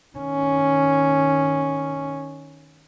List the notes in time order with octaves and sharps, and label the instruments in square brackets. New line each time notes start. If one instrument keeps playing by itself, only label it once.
[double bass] D#3 C#4